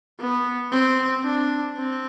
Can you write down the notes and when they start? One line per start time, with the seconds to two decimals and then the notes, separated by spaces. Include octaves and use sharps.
0.20 B3
0.71 C4
1.24 D4
1.77 C4